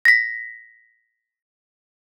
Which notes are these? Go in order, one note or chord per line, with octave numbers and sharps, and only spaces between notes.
A#6 B6